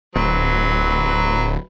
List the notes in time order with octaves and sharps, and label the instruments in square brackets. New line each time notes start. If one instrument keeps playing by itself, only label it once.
[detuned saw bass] D1 [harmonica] F#3 C4 B4